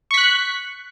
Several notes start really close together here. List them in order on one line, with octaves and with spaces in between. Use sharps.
C#6 B6 F#6